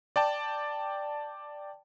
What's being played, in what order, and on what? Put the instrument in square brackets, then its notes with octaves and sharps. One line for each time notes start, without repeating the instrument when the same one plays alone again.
[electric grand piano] D5 G5 A5